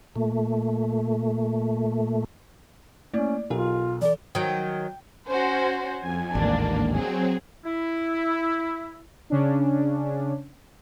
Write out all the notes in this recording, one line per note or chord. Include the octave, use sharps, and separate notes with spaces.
A#2 A3
A3 A#3 C#4 E4 D5
B1 F4 G4 A#4
E3 A4 D5
D#3 F#3 G5
C#4 F#4 C5
F2 G#5
A1 D#2 G#2 A#3 D4
F#3 C4 G#4
E4
C#3 C#4 D4